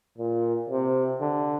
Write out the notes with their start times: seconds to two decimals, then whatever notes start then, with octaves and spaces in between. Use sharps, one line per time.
0.18 A#2
0.69 C3
1.20 D3